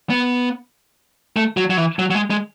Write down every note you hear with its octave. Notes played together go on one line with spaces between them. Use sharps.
B3
A3
F#3
F#3
E3
F#3
F#3
G#3
G#3